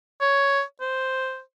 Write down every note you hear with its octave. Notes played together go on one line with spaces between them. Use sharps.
C#5
C5